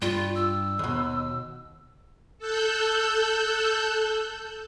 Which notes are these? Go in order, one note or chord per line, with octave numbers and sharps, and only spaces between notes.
G2 F4
E6
D#2 B2
A4 E6 F#6 G6